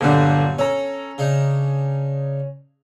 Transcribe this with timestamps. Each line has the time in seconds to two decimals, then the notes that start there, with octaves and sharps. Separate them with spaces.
0.01 G1 A#2 D3 F#3 G3
0.59 C#4 A4 A#5
1.18 C#3 D4 D#4